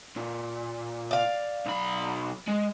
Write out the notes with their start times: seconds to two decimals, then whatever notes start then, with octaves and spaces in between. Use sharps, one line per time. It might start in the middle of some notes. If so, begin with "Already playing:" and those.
0.16 A#2
1.11 D5 F5
1.66 B1 B5
2.48 G#3